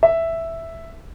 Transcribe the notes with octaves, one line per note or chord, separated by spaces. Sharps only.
E5